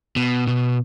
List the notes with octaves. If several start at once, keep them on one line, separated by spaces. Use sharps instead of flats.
B2
B2